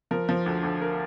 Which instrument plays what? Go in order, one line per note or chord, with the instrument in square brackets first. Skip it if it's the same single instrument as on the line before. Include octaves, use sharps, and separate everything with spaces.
[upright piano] F3 A#4
F3
D2
D2
A#4